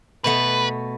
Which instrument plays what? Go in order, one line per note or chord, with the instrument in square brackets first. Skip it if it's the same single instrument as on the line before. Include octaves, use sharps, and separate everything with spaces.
[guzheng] B2 A3 B3 [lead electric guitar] B4